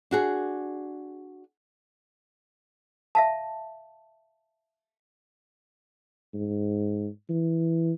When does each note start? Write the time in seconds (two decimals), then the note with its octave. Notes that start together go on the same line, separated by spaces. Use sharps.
0.11 D4 F#4 G#4
3.15 E5 F5 A5
6.34 G#2
7.29 E3